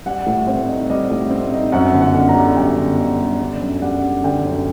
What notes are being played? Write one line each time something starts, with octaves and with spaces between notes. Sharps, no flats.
G3 F#5
A2
C4 C5
D#4
G3 D#5
A2
C4
D#4
F#2 F#5
G1
F#5
D3
A#5
G3
F#2 G5
G1
D3 D#5
G3
D3 D5
F#2
G3 F#5
D4
D3 G5
F#2